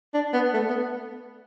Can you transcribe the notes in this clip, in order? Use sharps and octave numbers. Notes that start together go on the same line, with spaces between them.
D4
B3
A3
B3